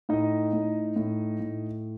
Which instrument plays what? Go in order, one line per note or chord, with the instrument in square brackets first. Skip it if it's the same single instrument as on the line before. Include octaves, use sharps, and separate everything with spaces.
[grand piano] A2 D#4 D#5
A2
A2
A2